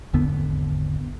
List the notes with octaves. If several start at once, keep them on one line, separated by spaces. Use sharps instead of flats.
G#1 E2 D3 B3